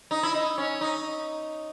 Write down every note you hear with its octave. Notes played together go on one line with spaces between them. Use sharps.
D#4
E4
D#4
C#4
D#4